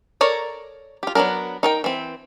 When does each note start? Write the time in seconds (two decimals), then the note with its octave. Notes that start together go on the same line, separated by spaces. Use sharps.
0.21 A4 A#4 C#5 D5 A#5
1.03 F4 G4
1.15 F#3 B3 D4 G#4 A#4
1.63 D#4 A#4 G5
1.84 E3 C4